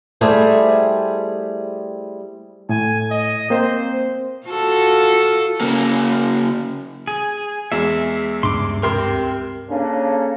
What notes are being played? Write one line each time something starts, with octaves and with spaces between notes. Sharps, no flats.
G3 A3 E4 G#4 C5
A2 G#5
D#5
A#3 C4 C5
F4 F#4 A4
C#3 A#3
G#4
E2 G#3 E5
C#2 G2 C6 D6
C3 G4 A#4 C6
C#3 A#3 C#4 D4 A4